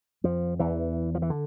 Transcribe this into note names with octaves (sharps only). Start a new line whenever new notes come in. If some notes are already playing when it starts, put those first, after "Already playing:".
F2 F3
E2 E3
F3
E3
D3